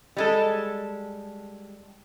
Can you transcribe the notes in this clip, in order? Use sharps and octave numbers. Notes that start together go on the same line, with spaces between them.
G3 G#3 A4